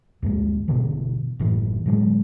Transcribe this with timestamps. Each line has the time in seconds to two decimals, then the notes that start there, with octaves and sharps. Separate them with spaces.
0.22 D2 G2 G#3
0.68 G1 B2 D3 E3
1.39 F#1 A2 E3
1.85 A2 D3 F#3 G#3